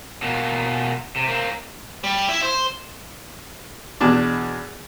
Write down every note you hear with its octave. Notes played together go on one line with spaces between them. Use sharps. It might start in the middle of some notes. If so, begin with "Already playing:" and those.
B2 A#3
C3
A#3 C4
G3
E4 E5
C5
E2 B2 D4 D6